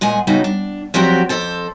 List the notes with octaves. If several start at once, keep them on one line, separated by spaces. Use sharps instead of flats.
A#2 G#3 F#5 G#5
C#3 G3 B3 D#4 F#4
D4
F3 F#3 C4 F#4 G4 D5
F2 A4 C5 A5